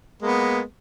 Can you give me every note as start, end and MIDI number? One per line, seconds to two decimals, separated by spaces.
0.22 0.60 56
0.22 0.60 58
0.22 0.60 59